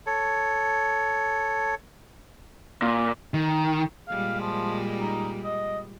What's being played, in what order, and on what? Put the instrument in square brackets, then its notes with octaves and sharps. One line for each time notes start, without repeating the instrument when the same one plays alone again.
[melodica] A4 C#5
[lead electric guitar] A#2
D#3
[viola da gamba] A#2 G3 G#3 [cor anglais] F5
[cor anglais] F3
D#4
D#5